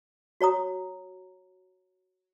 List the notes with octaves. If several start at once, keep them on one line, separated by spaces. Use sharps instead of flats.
F#4 C#5 A#5 D#6